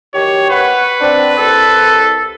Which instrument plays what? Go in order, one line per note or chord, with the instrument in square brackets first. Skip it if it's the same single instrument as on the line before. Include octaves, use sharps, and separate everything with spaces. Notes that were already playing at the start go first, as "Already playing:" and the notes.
[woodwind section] D#3 F#3 G4 [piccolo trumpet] C#5
[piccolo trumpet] B4 [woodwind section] F#5 [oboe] C#6
[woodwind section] C4 D4
[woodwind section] C2 [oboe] A4